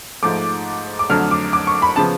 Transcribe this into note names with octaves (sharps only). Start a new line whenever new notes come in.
G#2 F3 A3 D6
D6
F2 D3 F#3 A3 F6
D6
D6
C#6
B5
C#3 F3 B3 A5